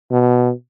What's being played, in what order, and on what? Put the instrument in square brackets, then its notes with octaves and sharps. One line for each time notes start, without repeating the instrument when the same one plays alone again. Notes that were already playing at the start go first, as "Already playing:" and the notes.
[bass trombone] B2